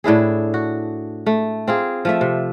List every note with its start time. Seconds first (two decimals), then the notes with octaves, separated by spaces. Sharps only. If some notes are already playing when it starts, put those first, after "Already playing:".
0.04 A2 D4 E4 G#4
0.54 F#4
1.26 A3
1.68 C4 F4 G#4
2.05 F3 A3 E5
2.21 C3